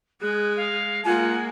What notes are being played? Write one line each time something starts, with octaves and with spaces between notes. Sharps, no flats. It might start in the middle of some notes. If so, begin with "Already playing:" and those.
G#3 G#4 F#6
F5
G#3 A#3 F4 F#5 G#5